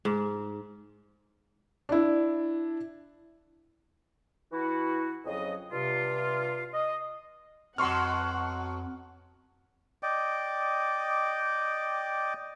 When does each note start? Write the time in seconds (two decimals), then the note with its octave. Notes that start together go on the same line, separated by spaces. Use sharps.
0.05 G#2
1.89 D4 E4
4.52 E3 E4 F#4
5.25 F2 C#3 F#3 G#4 D#5
5.71 G2 C3 F4
6.73 D#5
7.78 F2 B2 F#3 F#5 C6 C#6 F6
10.03 D5 D#5 G5 D6